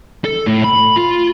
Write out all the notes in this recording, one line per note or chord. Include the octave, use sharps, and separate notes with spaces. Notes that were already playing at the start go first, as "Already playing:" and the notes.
A4
A2
B5
F4